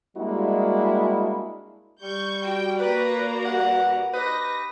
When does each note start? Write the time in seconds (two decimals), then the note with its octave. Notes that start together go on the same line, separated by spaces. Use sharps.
0.17 G3 G#3 A#3 D4 E4 F#4
2.01 G3 C#6 G6
2.44 F#4 G5
2.79 A#3 B4 D5 A#5
3.45 G2 B4 F#5
4.14 D#4 G4 B4 A#6